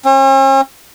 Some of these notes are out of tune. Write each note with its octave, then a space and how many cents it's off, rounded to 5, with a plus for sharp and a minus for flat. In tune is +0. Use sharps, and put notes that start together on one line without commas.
C#4 -45